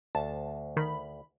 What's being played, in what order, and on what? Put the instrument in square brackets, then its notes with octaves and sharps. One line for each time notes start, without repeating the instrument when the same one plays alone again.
[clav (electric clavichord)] D2 [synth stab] A5
[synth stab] D#3 B5